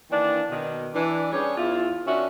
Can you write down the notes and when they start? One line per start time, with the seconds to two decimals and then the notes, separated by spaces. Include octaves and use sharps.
0.11 D#3 E3 A#3 D4
0.50 B2 D#3
0.94 E3 D4
1.32 G3 C#4 D4 G4 G#4 C#5
1.57 E2 E4 F4
2.07 D#3 C#4 D4 F#4 E5